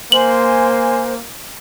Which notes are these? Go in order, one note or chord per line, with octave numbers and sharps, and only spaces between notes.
A#3 C5 G#5 C6 F#7